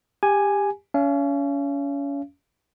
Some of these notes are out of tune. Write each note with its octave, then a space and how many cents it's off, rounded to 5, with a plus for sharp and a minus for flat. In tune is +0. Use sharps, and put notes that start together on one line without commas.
G4 +20 G#5 +0
C#4 +30 F5 -40